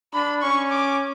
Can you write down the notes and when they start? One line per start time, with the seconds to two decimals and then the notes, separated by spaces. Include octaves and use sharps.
0.14 D4 B5
0.42 C#4 C#6
0.71 D6